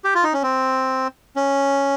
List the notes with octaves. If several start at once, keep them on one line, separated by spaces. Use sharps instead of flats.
G4
F4
D#4
C#4
C4
C#4